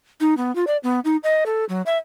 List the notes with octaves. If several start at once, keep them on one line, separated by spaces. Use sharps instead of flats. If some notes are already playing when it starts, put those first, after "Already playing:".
D#4
B3
F4
D5
B3
D#4
D#5
A4
F#3
E5